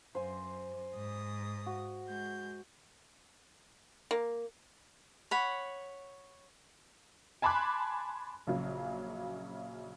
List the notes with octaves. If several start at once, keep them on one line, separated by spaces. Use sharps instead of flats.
F#2 C5 G#5
G#2 D#6
F#4
G#3 G6
A#3
C#5 F#5 B5
G#5 A5 B5 C6 D6 F#6
A#1 C#3 F#3